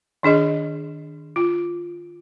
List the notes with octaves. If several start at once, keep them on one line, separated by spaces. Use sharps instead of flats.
D#3 D4 G#4 D#5
F4